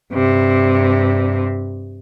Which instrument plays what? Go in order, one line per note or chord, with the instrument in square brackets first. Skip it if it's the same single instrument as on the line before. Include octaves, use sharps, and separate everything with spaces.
[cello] G2 C3